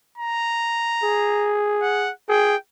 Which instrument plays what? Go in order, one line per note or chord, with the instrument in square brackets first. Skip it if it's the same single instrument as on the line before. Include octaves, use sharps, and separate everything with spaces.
[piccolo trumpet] A#5
[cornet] G#4
[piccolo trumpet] F#5
[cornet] G#4 [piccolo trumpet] G5